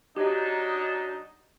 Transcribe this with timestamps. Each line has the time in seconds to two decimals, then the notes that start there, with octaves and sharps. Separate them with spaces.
0.17 F#3 D4 D#4 G4 D#5